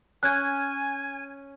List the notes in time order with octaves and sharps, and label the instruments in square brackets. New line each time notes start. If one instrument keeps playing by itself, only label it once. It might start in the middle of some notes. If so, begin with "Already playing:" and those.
[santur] C#4 [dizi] G#5 [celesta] F#6 G#6